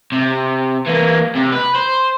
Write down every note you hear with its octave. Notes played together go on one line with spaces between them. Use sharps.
C3
E3 A#3
C3
B4
C5